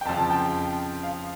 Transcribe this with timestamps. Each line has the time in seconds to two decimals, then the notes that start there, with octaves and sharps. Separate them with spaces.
0.01 G5
0.05 F2 C#3 F3 A5
0.30 G5
1.03 F5